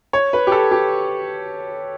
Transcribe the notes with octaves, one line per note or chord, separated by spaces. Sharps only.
C#5
B4
G4
A4
G4